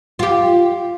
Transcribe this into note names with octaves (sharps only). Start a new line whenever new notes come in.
F4 G4